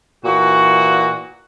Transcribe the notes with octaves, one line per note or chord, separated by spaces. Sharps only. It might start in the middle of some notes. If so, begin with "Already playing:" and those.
A#2 E3 F#4